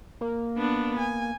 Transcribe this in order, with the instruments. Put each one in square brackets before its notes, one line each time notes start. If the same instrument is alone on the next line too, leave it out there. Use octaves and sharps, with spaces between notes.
[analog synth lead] A#3
[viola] B3 D4
G#5